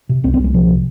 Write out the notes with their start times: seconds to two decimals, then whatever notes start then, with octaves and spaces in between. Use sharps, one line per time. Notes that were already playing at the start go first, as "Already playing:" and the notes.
0.09 C3
0.24 C2 C4
0.34 C4
0.39 C2 G#3
0.54 C3 F3
0.68 C3